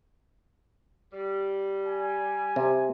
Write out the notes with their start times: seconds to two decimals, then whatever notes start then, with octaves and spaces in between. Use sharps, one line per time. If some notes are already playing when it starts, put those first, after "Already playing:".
1.13 G3
1.87 G#5
2.56 C3